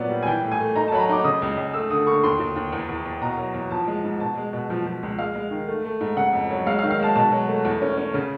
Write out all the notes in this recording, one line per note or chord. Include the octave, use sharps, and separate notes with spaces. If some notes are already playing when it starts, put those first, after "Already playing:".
Already playing: A#2 F#3 B3 D5
G3
G#5
E3 G5
A2
G#5
A3
D#4 A#5
A5
F#3 B5
A#5
D#4 D6
C#3 D#6
C#2
C#2
A3 E6
D3 D#6
D3 C#6
D#2 C6
D#2
D#2
E2
E2
E2
B2 A#5
F#3
E2
F3 A5
G#3
G#2
B2 A5
G#3
B2
F3
F3
C#2
G#3 F5
G#3
D#3
A3
A3
G#2
C#3 F#5
F2
F#3
G#3 F5
F5
D#3
F5
G#3 A5
B2 A5
F#3
A3
E2
C#4
C#4
C#3